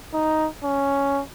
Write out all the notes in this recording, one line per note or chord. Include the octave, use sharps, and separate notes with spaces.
D#4
C#4